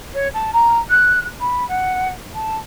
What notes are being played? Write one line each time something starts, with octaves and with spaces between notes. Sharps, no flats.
C#5
A5
A#5
F#6
B5
F#5
A5